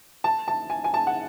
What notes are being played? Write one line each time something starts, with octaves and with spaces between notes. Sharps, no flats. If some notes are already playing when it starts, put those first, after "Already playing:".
A5
A5
G#5
G#5
A5
F#5